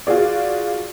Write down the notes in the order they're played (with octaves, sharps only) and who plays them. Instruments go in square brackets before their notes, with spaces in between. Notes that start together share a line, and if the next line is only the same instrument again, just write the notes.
[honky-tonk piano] F4 F#4 G#4 D5